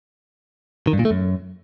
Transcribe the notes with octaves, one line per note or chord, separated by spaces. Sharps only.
D#3
G2
A#2
A3
F#2